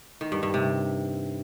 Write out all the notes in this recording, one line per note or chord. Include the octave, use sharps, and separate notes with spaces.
D#3
G2
G2
C3